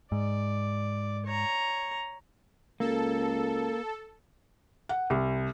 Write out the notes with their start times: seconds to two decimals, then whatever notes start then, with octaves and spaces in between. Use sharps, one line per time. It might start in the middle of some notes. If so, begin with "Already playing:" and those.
0.12 G#2 D5
1.25 C#5 A#5
2.80 C#2 A#3 A4
4.89 F#5
5.10 C2